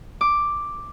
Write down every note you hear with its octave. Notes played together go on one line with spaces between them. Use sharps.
D6